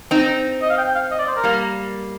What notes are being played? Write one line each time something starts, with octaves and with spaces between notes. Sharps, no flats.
C4 D#4
D#5
F5
G5
G5
F5
D#5
D5
C5
A#4
G3 A#3